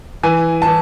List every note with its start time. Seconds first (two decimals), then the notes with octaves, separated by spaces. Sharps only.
0.23 E3 G#5
0.62 A5
0.67 E3